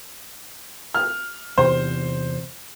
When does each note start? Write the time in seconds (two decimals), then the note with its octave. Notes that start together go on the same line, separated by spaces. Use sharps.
0.94 F6
1.58 E2 C3 C5